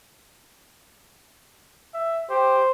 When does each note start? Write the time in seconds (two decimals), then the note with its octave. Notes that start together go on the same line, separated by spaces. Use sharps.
1.94 E5
2.30 G4 C5